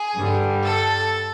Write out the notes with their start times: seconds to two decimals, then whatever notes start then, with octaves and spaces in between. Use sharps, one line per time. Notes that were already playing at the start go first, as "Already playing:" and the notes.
Already playing: G#4
0.16 G2 D3 G3
0.64 A4